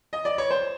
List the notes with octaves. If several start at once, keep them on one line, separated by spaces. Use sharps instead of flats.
D#5
D5
C#5
C5